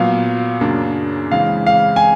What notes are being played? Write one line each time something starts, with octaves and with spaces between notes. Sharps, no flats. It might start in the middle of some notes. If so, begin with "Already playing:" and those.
Already playing: A#2 F#3 B3 F5
F#2 C#3 F#3 A#3 D4
C#3 E3 G#3 C4 F5
F5
G#5